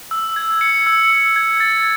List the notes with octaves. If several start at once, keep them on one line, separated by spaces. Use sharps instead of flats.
E6
G#6
C#7
E6
E6
G#6
A6